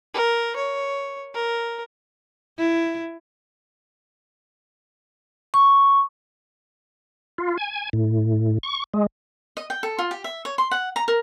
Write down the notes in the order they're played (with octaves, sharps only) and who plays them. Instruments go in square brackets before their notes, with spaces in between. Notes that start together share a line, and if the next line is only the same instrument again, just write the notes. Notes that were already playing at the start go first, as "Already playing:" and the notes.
[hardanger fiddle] A#4
C#5
A#4
[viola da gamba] E4
[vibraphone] C#6
[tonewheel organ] F4
G#5
A2
C#6
G#3
[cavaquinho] D#5
G5
A4
F4
G4
E5
C#5
C6
F#5
A#5
A#4